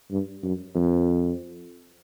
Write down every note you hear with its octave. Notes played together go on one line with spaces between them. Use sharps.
G2
F#2
F2